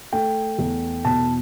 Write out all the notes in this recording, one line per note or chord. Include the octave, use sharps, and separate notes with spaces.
A3 G5
E2
B2 A5